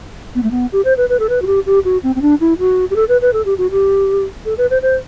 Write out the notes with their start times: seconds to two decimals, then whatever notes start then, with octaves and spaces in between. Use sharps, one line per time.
0.35 B3
0.43 A3
0.51 B3
0.72 G4
0.85 C5
0.97 B4
1.09 B4
1.19 A4
1.29 B4
1.42 F#4
1.47 G4
1.66 G4
1.85 F#4
2.03 C4
2.15 C4
2.22 D4
2.40 E4
2.59 F#4
2.90 G4
2.96 A4
3.09 B4
3.22 B4
3.33 A4
3.45 G4
3.58 F#4
3.71 G4
4.45 A4
4.58 B4
4.70 C5
4.82 C5